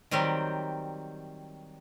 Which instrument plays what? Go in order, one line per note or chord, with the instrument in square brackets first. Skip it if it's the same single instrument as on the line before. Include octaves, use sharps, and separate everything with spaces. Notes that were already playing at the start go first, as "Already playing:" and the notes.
[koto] D#3 F#3 G3 C4 G4